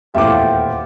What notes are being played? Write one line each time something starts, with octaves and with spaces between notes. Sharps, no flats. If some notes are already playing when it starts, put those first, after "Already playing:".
D#1 E2 A2 F4 G4 E5 F#5 D6